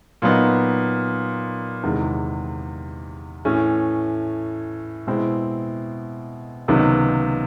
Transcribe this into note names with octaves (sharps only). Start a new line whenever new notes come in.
A#2 F#3 B3 D#4
E2 C3 D#3 G#3
A2 E3 A3 C#4
B2 G#3 C4 E4
C#2 C3 D#3 F#3 B3